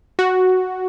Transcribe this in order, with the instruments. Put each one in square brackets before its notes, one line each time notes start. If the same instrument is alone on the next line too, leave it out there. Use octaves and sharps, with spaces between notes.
[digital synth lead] F#4